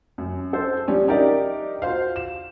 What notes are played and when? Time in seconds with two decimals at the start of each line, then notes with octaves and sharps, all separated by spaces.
0.18 F#2
0.53 A4 C5
0.87 F3 G3 C#4 D4
1.08 D4 D#4 G4 A#4 D5 E5
1.82 F4 F#4 C5 F5
2.16 E7